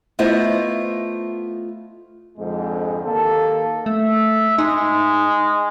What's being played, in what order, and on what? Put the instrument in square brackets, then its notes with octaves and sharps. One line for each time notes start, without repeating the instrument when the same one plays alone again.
[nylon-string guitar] A3 B3 E4 F4 C5 D#5
[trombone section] F2 G#2 D3 G#3
D#2 A#3 A4
[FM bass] A3 [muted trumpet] E5
[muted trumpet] G#3 [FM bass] D#4